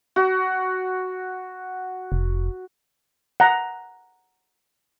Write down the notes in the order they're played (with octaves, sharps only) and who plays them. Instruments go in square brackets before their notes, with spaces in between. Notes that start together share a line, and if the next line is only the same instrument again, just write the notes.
[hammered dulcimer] F#4
[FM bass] F1
[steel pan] F#5 A#5